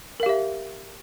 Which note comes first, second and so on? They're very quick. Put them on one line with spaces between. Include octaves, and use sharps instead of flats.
A#4 F5 G4 E5